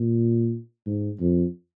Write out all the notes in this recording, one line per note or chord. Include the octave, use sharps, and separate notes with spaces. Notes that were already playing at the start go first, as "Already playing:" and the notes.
Already playing: A#2
G#2
F2